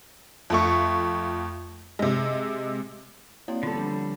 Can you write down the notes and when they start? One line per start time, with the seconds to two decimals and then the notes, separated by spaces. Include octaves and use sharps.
0.50 F2 A3 C#6
1.99 C3 G#3
3.48 A#3 C4 E4 F#4 C#5 D5
3.63 D3 G3 B3 F4 A4
3.77 F3 D4 B4